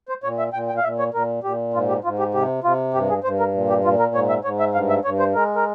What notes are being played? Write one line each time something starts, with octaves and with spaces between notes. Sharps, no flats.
C5
A#2 C#5
E5
A#2 G5
G5
F5
A#2 E5
C#5
A#2 A#4
A#2 G4
G#2 F4
G4
G#2 F4
G4
C3 G4
C3 F4
G2 G4
G#4
G2 C5
A#4
A#2
G4
A#2 F4
A#4
G#2 C#5
E5
G#2 C#5
E5
G2 F5
E5
G2 C#5
C5
G#3 A#4
A#4